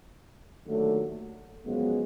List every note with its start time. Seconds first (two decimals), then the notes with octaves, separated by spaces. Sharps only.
0.65 D#2 D3 F#3 A3
1.66 F#2 C#3 F3 G#3 B3